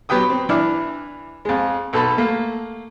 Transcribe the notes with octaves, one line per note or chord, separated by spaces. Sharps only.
F#3 B3 G4 B4 G5 D#6
C4
E3 D4 E4 D6 F6
F2 G#3
B1 A4 A5 B5
A3 A#3